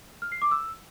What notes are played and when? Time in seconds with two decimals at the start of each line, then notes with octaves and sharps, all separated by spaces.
0.22 F6
0.32 C7
0.42 D6
0.51 E6